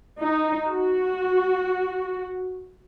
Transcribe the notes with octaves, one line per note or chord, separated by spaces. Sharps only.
D#4
F#4